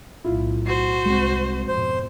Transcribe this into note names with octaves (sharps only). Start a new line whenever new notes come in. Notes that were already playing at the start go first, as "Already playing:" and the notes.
B1 A2 E4 F4
F#4 C5 C7
C2 G#3 C4
F2 G#2 B2 C5